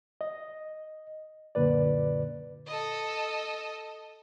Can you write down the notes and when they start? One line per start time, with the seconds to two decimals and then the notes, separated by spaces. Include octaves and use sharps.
0.21 D#5
1.55 F#2 A#2 D3 B4 D5
2.67 A4 D#5